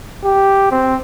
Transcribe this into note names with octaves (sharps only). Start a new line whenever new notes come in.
G4
C4